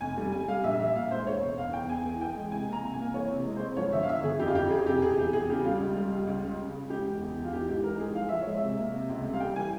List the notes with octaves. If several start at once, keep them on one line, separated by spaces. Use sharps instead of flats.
F1 G#5
G3
G3 G#5
G3 F5
A#1 E5
A#1 E5
A#2 F5
G#3 C5
E1 C#5
E1
E2 F5
E2 G5
E2 G#5
E3
E3 G5
G#3
C3 G#5
A#3
A#5
C2
G#5
A#3
E3 C#5
C3
G#3
G#3 C5
F3 C#5
G1 E5
F5
G1 E5
G1 G#4
F2 G4
F4
F2 G4
F2 G#4
C3 G4
E1 G#4
E3 G4
E2 G#4
C#3 G4
G3 F4
C#2
G3
C#2
C#2
C#3
C#3
C#3
G#3 G4
E2
E2
E2
F4
E3 G4
G#2 G4
E3 A#4
G#2 G#4
F3 F5
F3 E5
C#5
G#3
E5
C3
A#3
C3
C#2
G3
F5
G3 G5
E3 G#5